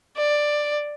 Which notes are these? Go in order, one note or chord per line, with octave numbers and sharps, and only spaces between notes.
D5